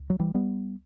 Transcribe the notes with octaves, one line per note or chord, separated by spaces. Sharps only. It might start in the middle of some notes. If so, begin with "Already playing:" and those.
Already playing: C#2
F#3
E3 G3
G3 B3